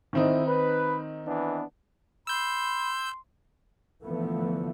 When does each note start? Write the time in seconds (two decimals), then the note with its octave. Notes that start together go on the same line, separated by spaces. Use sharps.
0.13 D3 D#3 C4 D#4 E4
0.47 B4
1.26 E3 B3 D4
2.27 B5 C6 E6 G6
4.05 D3 E3 F3 A3 B3